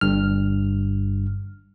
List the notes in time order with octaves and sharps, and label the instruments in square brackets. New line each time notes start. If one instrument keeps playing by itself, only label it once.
[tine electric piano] G1 G2 F6